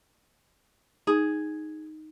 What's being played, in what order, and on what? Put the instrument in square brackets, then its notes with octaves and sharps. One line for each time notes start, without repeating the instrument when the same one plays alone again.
[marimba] D#4 [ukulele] G#4